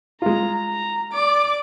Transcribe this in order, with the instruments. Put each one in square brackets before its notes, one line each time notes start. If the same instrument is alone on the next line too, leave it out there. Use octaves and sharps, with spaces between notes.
[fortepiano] G#3 F4 [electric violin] A#5
[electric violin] A#5
[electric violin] D5 [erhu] D6